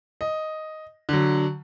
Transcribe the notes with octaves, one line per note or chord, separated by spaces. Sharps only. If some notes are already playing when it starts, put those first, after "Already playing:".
D#5
D3 F#3